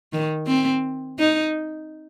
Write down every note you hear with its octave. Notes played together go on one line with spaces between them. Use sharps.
D#3
C4
D#4